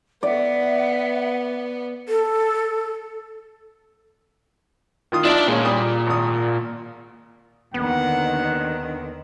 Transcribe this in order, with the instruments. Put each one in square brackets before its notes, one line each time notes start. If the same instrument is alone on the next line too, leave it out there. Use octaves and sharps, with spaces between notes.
[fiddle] B3 [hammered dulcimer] D5 [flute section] E5 F#5
[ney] A4
[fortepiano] D#3 F4 D#6
[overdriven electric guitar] D4 D5 [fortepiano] D#4 F4 E5
[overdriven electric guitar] A#2 [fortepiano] G#3 C#4
[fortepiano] G3 D#6
G#1 D#6
[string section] D#2 D3 D#3 [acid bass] B3 [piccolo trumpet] F#5